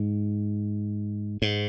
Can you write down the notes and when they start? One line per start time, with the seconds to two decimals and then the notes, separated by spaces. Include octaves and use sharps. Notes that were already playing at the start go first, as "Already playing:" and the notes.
Already playing: G#2
1.42 G#2